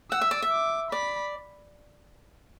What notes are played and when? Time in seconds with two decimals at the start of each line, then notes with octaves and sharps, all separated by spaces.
0.11 F#5 E6
0.21 E5
0.31 D5
0.42 E5
0.52 D6
0.91 D5 B5